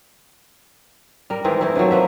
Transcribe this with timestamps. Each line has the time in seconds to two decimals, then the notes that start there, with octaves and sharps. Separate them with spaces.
1.30 G3 A#4
1.44 D#3 E3 G#3 C4
1.61 E3 A3 D#4 E4
1.76 C3 D#3 F3 F#3
1.91 F3 A#3 B4 E5